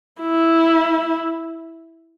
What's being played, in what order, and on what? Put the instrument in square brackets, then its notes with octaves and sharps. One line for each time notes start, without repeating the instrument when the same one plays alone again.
[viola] E4